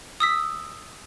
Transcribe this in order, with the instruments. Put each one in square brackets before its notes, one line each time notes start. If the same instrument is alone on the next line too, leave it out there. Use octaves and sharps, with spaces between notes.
[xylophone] D#6 E6 B6